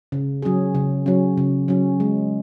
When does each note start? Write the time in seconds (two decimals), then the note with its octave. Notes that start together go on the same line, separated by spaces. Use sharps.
0.12 C#3
0.42 F#3 C#4 G#4
0.75 C#3
1.06 F#3 C#4
1.37 C#3
1.68 F#3 C#4
2.00 G#3